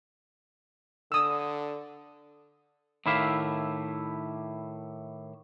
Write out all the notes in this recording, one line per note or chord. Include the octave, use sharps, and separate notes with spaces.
D3 D#6 E6
A2 D#3 E4 G4 E5 F5